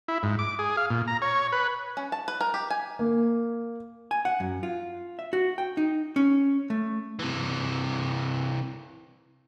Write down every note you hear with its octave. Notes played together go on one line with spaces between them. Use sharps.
E4
G#2
D6
G#4
F5
A#2
A#5
C#5
B4
C#4
A5
B4
A#4
G4
G#5
A#3
G#5
F#5
F#2
F4
E5
F#4
G5
D#4
C#4
A3
C3 E3